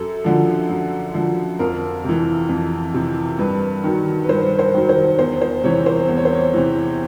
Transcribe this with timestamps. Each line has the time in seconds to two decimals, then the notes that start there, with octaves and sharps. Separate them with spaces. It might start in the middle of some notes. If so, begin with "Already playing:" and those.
Already playing: F#2 A4
0.24 D3 F3
0.70 F#2
1.14 D3 F3
1.59 F2 A#4
2.04 C3 E3
2.49 F2
2.94 C3 E3
3.39 G2 B4
3.84 D#3 F#3
4.24 B4
4.29 G2 C5
4.59 C5
4.74 D#3 F#3
4.89 C5
5.19 E2 C5
5.41 C5
5.64 C3 E3 C#5
5.86 C5
6.09 E2
6.17 C#5
6.25 C5
6.33 C#5
6.54 C3 E3